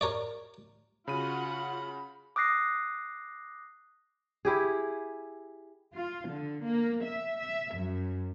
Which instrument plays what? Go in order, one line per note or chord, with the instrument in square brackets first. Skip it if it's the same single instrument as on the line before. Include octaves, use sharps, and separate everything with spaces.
[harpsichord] A#4 C#5 D5
[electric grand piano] C#3 D#7 [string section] F4 F#4 F#5 [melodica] B5
[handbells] D6 D#6 F#6 A#6 C7
[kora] E4 G4 G#4
[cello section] F4
D3
A#3
E5
E5
F#2